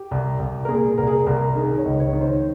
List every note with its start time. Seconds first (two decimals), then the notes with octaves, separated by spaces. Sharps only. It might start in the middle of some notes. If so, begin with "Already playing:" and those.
Already playing: G4
0.11 C2
0.39 C2
0.65 A#4
0.68 A#2 G#4
0.98 C2 A#4
1.07 G#4
1.15 A#4
1.26 C2 A#4
1.55 D#3 G#4
1.78 C#5
1.85 C#2
2.00 C#5
2.13 D#3
2.21 C5